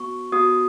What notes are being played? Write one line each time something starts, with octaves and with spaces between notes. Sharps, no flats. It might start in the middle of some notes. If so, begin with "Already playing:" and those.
Already playing: B3 F#4 C#6
B3 F#4 D#6